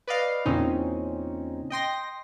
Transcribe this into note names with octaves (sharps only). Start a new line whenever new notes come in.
B4 D5 D#5 F5
E2 A#2 C#3 C4 C#4 D#4
D#5 G5 C6 A#6